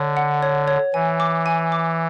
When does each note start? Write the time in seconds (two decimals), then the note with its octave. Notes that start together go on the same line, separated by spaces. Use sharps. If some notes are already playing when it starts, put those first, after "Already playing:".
Already playing: D3 C#5
0.17 F#5
0.43 C#5
0.68 C#5
0.94 E3 G#5
1.20 D6
1.46 G#5
1.72 D6